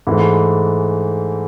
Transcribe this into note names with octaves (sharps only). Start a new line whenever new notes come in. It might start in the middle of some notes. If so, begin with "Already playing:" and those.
G#2 E3 A3